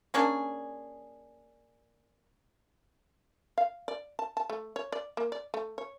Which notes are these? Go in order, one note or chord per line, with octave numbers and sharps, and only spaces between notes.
A#3 C#4 D4 G#4
F5
D5
A5
A5
A3
C#5
D5
A#3
D5
A3
C#5